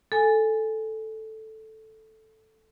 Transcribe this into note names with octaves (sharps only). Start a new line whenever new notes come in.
A4 G#5